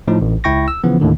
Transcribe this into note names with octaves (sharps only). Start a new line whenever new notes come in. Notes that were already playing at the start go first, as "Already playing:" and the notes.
A2 F3 D#4
A1
C#2 E4 G5 C#6 A#6
E6
C#3 E3 F3 B3
D#2 A2 D3 D#3